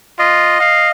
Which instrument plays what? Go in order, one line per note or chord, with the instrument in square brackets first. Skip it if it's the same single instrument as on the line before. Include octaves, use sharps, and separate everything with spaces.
[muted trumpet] F4 [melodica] D#5
[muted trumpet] F5